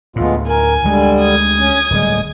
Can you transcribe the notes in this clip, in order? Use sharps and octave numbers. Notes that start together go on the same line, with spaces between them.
D2 A2 G#3 B3 F4
A#4 G#5
D2 D3 G3 G#3
D#6 G#6
C#4
D1 G3 G#3